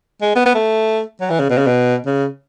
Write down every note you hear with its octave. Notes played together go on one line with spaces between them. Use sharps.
G#3
B3
B3
A3
F#3
E3
C#3
B2
C#3
B2
C#3